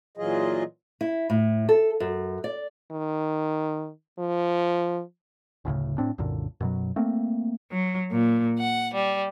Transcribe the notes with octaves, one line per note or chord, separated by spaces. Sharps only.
A#2 E3 F#3 F4 G#4 D#5
E4
A2
A4
F#2
D5
D#3
F3
F#1 D2 A2 C#3
A2 C4 D4
C2 F#2 A#2 D3
F#2 B2 F#3
A3 A#3 C4
F#3
A#2
F#5
G3